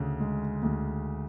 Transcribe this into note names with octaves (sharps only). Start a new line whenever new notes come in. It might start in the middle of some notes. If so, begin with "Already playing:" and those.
Already playing: D2 C#3
G#3
D2